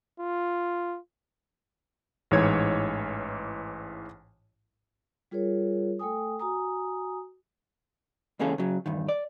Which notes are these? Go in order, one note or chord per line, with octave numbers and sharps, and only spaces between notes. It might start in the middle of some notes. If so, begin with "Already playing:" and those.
F4
A1 G#2 E3 C#5 G#6
G3 F4 G#4 A#4 C#5
A3 A4 G5 G#5 D#6
F#4 G#5 A#5 D#6
C#2 E3 A#3 C#4 G#4 A4
C#3 F#3
E2 G2 D#3
D5